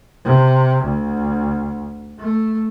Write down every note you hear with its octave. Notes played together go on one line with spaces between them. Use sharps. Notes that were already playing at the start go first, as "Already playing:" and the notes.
C3
D2
A3